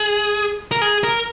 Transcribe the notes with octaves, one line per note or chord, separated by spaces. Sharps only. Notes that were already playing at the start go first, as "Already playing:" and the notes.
Already playing: G#4
A#4
G#4
A#4